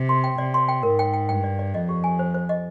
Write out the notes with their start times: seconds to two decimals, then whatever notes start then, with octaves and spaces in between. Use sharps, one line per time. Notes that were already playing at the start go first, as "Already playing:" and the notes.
Already playing: C3
0.09 C6
0.24 G5
0.38 C3 D5
0.54 C6
0.68 G5
0.83 G#2 A#4
0.99 G5
1.13 G5
1.29 G2 G5
1.44 D5
1.59 D5
1.73 F2 D#5
1.89 G4
2.04 G#5
2.19 C5
2.34 C5
2.49 D#5